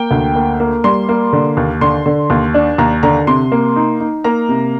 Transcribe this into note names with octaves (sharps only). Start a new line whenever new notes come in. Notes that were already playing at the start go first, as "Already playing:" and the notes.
Already playing: A#3 G5
D2
A#3
A#3
G3 C6
A#3
D3
D#2
D3 C6
D3
D#2
D4
D#2 A#5
D3 A#5
C3 C6
A#3
D#4
D#4
A#3 A#5
C3